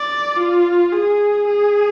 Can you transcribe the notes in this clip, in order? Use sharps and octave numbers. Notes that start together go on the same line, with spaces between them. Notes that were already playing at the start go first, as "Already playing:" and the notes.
Already playing: D5
F4
G#4
G#4